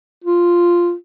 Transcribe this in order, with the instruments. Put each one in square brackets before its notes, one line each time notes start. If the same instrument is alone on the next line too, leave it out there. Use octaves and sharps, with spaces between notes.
[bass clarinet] F4